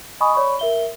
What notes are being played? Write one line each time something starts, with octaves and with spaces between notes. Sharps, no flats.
D#5 G#5 B5 C#6 D#6
C#5 D5 B5 C#6
A#4 E5 G7